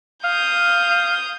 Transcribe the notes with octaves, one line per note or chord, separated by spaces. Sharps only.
F5 D#6 G6